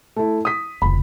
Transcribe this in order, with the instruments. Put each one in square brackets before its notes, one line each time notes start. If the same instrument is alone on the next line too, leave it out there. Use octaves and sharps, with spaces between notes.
[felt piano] A3 E4
D#6 B6
[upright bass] F1 C#2 [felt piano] B5